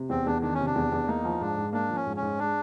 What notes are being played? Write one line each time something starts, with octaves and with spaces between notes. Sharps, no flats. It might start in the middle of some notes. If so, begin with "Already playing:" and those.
Already playing: C3
E2 C4
E2 D4
D#3 D4
C#4
C3
D4
E2
E2
A#3 D#4
F3
G#2 D4
G#2
A#3 D4
F3
C#4
G#2
C#4
G#2
G#3 D4